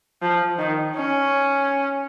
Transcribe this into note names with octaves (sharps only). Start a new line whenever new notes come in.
F3
D#3
C#4